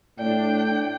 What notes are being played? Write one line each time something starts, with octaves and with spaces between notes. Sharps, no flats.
A2 D4 C#5 D5 G5